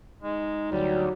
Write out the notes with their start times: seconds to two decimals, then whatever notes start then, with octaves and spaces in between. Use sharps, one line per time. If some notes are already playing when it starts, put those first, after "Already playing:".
0.22 G#3 D#4
0.72 D2 F#3 G3